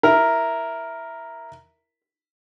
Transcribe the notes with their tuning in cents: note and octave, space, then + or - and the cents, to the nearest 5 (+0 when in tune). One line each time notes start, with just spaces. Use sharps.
E4 +0 A#4 +0